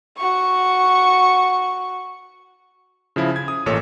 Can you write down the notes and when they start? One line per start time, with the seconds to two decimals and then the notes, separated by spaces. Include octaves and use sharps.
0.17 F#4 C#6
3.16 C#3 F3 E4
3.36 G#6
3.48 D#6
3.66 A1 A#2 A4 C#5 E6